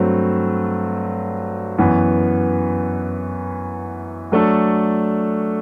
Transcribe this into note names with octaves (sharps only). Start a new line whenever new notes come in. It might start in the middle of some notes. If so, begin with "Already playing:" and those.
Already playing: G2 F#3 A3 C4
F#2 E3 B3
F#3 A3 D4 A4